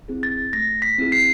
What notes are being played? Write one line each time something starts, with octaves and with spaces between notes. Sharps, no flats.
C4 E4 G#4
A6
A3 A#6
B6
C4 E4 G#4
C7